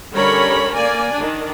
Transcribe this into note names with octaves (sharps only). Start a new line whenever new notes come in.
D3 G3 C#4 A#4 C#5 B5
A#3 D5 G#5
D#3 D4